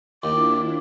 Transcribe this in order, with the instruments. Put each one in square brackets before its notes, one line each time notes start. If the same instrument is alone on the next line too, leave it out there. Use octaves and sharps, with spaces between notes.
[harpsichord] D#2 [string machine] D4 E4 F4 [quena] D6